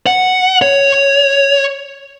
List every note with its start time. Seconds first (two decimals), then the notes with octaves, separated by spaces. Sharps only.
0.07 F#5
0.62 C#5